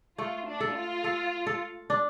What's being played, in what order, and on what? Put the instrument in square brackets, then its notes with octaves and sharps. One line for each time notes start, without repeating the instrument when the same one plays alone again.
[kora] A3 [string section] F4
[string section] D4
[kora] A4
[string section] F4
[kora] A4
A4
D4